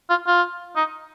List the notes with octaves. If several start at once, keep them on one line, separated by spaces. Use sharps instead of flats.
F4
F4
D#4